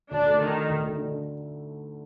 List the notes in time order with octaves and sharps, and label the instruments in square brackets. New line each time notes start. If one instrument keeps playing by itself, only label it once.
[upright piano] D2 [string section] D4
[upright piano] A3
[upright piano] D3 [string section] D#3
[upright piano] D#4
D2
A3
D3